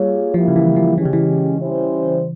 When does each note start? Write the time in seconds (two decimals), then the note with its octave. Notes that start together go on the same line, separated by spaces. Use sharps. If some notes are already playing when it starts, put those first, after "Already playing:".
Already playing: G3 A#3 F4 G#4 C#5
0.34 F3 A#3 E4 G4
0.48 C#3
0.56 E3
0.76 F3
0.98 E3 G#3 C#4 G4
1.05 C#3
1.13 E3
1.60 G3 C#4 E4 G4 C5